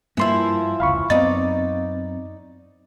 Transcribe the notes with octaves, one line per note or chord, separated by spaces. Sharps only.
G2 E3 F3 A#3 E4 C6
F1 C#2 F5 B5 C#6
F#2 B3 C4 D#4 D5 A6